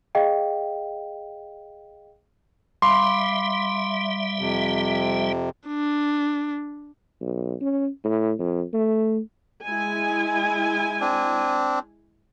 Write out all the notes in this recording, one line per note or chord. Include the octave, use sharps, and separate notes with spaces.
G#4 D#5 F5 G5
G3 E5 F5 B5 C6 D6
F2 C3
D4
B1
C#4
A2
F2
A3
G#3 E4 G#5
C4 D4